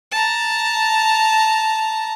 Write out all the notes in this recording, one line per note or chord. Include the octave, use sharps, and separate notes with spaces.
A5 A#5